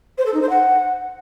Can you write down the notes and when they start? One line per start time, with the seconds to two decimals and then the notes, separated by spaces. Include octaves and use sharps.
0.18 C5
0.26 A4
0.34 D#4
0.41 C5
0.49 F#5